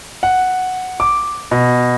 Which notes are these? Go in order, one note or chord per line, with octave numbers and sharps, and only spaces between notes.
F#5
D6
B2